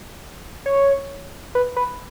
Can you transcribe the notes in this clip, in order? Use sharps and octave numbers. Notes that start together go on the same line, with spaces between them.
C#5
B4
B4